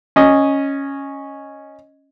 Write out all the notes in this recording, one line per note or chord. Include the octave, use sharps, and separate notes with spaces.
C#4 D#5